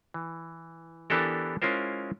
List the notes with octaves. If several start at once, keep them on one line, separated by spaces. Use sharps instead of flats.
E3
E3 B3 D4 G4 A4 A#4
G#3 C#4 E4 F4 A#4 C5